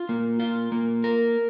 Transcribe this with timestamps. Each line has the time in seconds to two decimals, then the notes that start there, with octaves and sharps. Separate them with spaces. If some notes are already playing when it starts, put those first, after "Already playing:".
Already playing: F4
0.09 A#3
0.40 F4
0.72 A#3
1.04 A#4